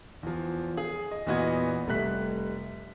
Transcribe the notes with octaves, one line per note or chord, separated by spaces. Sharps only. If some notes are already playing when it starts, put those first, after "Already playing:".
E2 F3
G#4
D#5
E2 A#2 B3 F#4 D#5 G#6
F1 G3 A3 F#6 B6